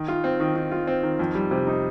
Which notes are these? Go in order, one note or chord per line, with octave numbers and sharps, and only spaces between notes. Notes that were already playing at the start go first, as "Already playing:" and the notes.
Already playing: D#3
F4
C4
D#3
D#3
F4
C4
D#3
F2
G3
C3
D#4